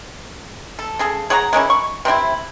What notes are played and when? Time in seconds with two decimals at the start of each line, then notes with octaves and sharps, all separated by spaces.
0.79 A4
0.99 C#3 G#4 A4
1.30 G#4 C#5 F#5 A#5
1.53 G#3 A#3 C#4 E4
1.70 C#6
2.05 C3 C4 D4 E4